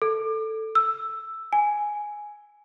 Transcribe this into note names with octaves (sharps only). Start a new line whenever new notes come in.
A4
E6
G#5